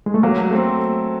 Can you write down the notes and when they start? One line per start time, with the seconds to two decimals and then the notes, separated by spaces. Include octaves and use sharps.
0.06 G#3
0.14 A3
0.23 F#3 A#3
0.50 A3 C4